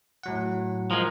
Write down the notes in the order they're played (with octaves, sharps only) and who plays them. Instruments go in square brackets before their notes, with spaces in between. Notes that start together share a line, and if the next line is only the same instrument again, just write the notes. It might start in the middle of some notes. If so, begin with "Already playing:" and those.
[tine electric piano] A2 F#3 F#5
[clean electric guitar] F3 G#3 [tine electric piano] A#4 A#5